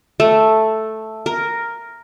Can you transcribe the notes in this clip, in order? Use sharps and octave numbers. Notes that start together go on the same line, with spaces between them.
A3
A#4